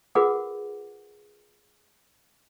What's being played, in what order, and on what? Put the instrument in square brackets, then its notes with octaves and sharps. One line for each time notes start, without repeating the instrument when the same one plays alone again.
[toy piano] F4 G#4 A#4 B4 F#5 D6